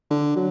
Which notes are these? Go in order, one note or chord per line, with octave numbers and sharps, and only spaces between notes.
D3
F#3